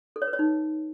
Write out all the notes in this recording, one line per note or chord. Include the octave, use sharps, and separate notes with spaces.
A4
C#5
B4
C#5
D#4